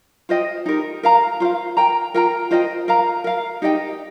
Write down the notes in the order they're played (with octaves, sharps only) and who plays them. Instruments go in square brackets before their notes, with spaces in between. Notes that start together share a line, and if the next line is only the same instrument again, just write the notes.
[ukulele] F4 C5 D#5 G5
D#4 G4 A#4
A#4 F5 A#5
F4 C5 F5
A#4 G5 A#5
F4 A#4 G5 A#5
F4 C5 D#5 G5
A#4 F5 A#5
A#4 F5 A#5
D#4 G4 D#5 G5